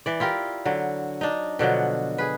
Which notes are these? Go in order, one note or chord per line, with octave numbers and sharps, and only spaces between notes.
E3 D5
E4 F4 G4 A#4
D3 F#3
D4 D#4
B2 D3 F3 F#3
G#4 B4